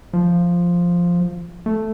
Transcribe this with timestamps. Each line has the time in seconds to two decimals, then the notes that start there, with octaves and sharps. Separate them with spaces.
0.13 F3
1.66 A3